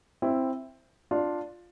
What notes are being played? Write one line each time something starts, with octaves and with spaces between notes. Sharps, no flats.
C4 E4
D4 F4